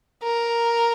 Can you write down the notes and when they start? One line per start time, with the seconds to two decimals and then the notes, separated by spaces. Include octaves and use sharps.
0.23 A#4